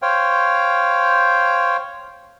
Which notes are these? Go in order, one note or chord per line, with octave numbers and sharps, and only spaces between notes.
C5 C#5 F5 G5